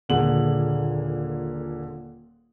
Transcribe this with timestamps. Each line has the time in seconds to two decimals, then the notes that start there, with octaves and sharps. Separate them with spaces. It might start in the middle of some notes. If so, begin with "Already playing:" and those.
0.09 D#1 A#2 D3 G#4 F#7